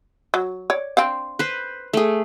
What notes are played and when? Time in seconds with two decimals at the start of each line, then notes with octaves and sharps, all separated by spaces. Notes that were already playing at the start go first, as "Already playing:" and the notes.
0.34 F#3
0.70 C#5 D5
0.97 C4 D4 F5
1.39 B4 C5
1.93 A3 G#4